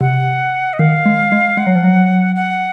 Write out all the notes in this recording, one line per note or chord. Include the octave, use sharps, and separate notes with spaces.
C3 F#5
D#5
D#3 F5
G#3
G#3
G#3 F#5
F#3
F3
F#3
F#5